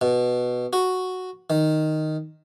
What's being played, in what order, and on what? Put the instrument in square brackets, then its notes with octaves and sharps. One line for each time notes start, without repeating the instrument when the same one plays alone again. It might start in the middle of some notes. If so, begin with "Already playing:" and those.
[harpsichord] B2
F#4
D#3